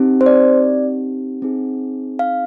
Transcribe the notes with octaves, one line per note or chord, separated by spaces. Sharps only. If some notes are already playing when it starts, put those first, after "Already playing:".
Already playing: C4 D#4 G4
C5
D5
C4 D#4 G#4
F5